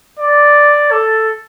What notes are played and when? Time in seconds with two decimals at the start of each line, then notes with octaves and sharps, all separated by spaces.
0.19 D5
0.91 A4